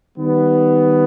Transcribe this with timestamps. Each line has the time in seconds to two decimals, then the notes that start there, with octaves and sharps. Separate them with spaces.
0.18 D#3 G3 B3